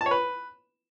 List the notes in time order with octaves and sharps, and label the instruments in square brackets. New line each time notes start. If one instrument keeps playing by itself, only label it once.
[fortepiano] A5
C#5
B4